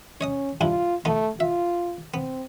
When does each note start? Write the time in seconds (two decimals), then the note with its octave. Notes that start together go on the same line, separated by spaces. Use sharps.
0.21 C#4 C#5 D#5 D#6
0.61 G2 F3 E4 F4
1.05 F3 A3 B3 D#4
1.40 F4 E5
2.14 B3 C4